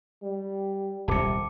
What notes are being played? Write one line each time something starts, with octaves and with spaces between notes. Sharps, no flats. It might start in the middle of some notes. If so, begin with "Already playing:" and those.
G3
D#1 C2 C3 A5 D6 C#7